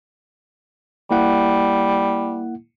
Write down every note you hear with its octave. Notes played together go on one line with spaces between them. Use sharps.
G3 A#3 E4 F#5